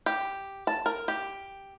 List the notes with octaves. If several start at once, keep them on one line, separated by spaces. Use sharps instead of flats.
G4
A5
A#4
G4